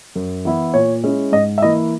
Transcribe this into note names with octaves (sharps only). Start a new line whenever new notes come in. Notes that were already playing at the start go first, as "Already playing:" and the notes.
F#2
E3 B3 E4
A#2 C#5
G#3 C#4 E4
G#2 D#5
E5
E3 A#3 E4 D#5